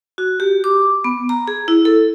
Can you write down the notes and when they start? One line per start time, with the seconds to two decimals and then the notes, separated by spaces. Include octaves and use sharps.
0.18 F#4
0.40 G4
0.64 D6
1.04 B3
1.29 A#5
1.48 G#4
1.68 E4
1.85 A4